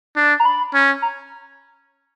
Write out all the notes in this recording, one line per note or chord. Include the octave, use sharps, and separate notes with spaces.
D4
A#5
B5
C#4
A#5